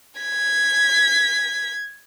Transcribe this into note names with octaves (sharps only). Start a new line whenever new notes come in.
G#6 B6